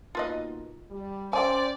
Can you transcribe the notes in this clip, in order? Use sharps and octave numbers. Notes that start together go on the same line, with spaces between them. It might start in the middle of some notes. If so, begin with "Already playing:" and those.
B2 A#3 D#4 F4 B4 D#5
G3
C#4 C5 D5 G5 G#5